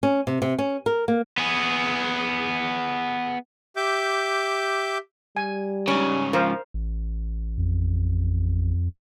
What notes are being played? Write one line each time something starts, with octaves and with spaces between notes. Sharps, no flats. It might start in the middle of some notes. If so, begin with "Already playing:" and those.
C#4
C3
C3
C#4
A#4
A#3
B3 G#4
G4 E5 D6 G6
G3 G#5
G#2 C#3 C#4
F3 A#4 C5
A1
F2